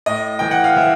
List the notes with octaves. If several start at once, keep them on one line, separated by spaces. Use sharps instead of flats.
A2 D#5
E3 G5
F#5
F5
E3 E5